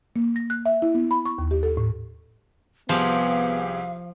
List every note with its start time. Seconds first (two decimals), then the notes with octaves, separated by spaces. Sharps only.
0.16 A#3
0.36 A#6
0.50 F#6
0.66 E5
0.82 E4
0.95 B3
1.11 B5
1.25 C#6
1.38 D#2
1.51 G4
1.63 A4
1.77 A2
2.89 C2 F3 B3 G4 G#4 F5